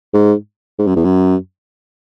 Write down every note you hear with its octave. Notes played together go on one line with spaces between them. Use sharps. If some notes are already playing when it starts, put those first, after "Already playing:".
G#2
G#2
F#2
E2
F#2